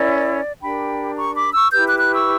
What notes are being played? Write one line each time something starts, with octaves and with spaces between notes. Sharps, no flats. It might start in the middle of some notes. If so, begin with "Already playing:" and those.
Already playing: C#4 E4 A#4 D5
D4 G4 A#4 G5 B5
A#5 C#6
B5 D6
C#6 E6
E4 G4 B4 E6 G6
D6 F#6
D6 F#6
C#6 E6